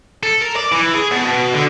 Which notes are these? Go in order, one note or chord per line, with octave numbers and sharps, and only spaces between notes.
A4
A#4
D5
E3
G#4
B2
B2
D3